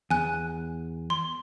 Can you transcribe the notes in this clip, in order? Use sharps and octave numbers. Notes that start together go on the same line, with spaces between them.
E2 G#5 F#6
C6